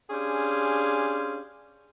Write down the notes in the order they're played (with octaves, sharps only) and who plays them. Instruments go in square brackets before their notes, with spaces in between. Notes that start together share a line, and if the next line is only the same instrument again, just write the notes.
[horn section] C#4 D4 G4 G#4 F5 C6